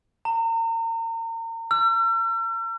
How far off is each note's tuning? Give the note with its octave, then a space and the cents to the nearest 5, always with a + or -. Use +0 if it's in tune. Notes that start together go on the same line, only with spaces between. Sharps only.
A#5 -35
E6 +45